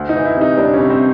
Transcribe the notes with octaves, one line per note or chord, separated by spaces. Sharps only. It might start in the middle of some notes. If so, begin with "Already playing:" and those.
Already playing: D2
D#4
E3
E4
C3 D#4
G3 D4
C#4
C3
C4